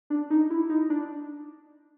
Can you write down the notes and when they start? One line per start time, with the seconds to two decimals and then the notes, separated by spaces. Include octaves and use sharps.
0.10 D4
0.30 D#4
0.50 E4
0.69 D#4
0.90 D4